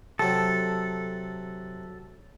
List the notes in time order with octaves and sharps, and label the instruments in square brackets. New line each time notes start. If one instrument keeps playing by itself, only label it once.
[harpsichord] C3 F#3 [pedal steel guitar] A4